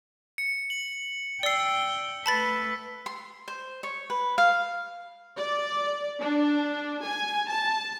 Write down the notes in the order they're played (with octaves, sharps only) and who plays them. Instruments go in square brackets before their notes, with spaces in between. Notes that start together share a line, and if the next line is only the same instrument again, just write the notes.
[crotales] C#7
F#7
[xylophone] D5 C7 [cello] G5 [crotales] E6 G7
[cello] A3 B4 [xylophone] A5 B5 A6
[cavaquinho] C6
C5
C#5
B4
F5
[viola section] D5
D4
G#5
A5